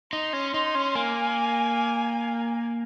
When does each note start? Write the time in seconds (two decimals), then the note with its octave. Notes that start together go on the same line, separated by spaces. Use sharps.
0.13 D#4 C6
0.33 C#4
0.54 D#4
0.75 C#4
0.95 A#3 G#5